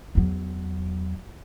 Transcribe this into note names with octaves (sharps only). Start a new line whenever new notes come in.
E2 F#3